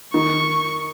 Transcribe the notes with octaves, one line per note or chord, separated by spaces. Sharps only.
D#3 C#6